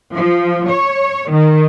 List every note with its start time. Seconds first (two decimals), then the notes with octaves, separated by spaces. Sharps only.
0.14 F3
0.69 C#5
1.31 D#3